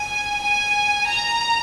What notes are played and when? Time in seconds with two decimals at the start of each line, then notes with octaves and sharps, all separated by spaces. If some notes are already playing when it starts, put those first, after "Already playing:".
Already playing: G#5
0.41 G#5
1.07 A#5